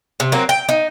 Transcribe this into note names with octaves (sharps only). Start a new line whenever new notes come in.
C3
F#3 A#3 C4
G5
D#4